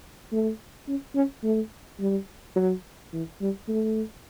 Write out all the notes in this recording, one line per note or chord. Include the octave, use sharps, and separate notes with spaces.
A3
C#4
C#4
A3
G3
F#3
E3
G3
A3